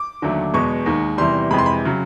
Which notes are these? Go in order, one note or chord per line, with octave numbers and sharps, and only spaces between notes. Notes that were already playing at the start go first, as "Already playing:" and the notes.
Already playing: D6
D#2 D3 F#3 A3
E2 B2 G#3 C#6
D#2 D#3 G#3
E2 C3 E3 G3 C6
F2 C3 E3 G#3 B5
C6
B5
C#3 F#3